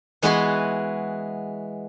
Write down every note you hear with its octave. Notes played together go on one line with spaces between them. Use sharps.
E3 G#3 B3 F#4 B4 C6